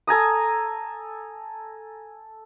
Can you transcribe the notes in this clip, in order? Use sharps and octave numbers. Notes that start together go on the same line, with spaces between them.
A4 G#5 A#5 D#6